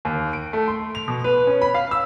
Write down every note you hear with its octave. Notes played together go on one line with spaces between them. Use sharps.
D#2
D7
A3
C6
F7
B2
B4
C#4
B5
F5
E6